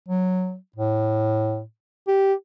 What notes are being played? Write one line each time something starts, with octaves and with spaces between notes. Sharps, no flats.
F#3
A2
G4